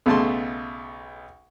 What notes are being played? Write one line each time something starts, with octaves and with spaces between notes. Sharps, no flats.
B1 C#3 A3 A5 C6